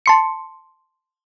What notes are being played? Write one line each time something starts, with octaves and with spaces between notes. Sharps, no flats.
A5 C6 C#7